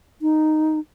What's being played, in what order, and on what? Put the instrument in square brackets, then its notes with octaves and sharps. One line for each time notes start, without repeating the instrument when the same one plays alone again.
[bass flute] D#4